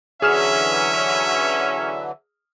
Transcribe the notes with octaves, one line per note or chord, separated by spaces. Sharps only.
D3 E3 F#3 C#4 G#4 E5 F6 E7